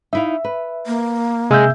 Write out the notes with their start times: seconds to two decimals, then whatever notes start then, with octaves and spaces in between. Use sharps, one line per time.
0.13 D#4 E4 E5 F5
0.45 B4
0.87 A#3
1.51 C3 G#3 E5 F5 E6 G6